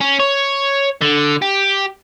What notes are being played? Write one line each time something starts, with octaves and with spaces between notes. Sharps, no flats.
C#4
C#5
D3
G4